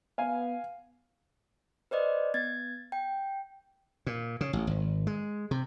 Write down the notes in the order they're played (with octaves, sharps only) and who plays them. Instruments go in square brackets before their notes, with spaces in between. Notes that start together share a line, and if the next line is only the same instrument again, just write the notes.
[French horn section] B3 [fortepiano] F5 G#5
[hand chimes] B4 C5 D5 D#5
B3 G#6 A6
G5
[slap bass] A#2
C#3
A1
G#1
G#3
C3